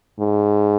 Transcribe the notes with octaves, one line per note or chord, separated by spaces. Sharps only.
G#2